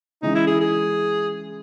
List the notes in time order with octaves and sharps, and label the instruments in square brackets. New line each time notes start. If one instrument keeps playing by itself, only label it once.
[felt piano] E3 G#3 C#4 [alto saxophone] D#4
[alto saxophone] E4
G#4
G#4